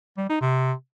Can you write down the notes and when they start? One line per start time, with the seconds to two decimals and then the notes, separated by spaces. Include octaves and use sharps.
0.17 G3
0.29 D#4
0.41 C3